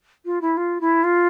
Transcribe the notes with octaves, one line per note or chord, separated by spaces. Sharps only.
F4
E4
F4
E4
F4